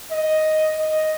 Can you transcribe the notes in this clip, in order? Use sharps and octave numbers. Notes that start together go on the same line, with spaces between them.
D#5
D#5